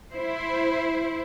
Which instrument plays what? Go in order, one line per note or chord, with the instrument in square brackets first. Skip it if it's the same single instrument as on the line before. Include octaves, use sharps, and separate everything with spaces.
[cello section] E4 C5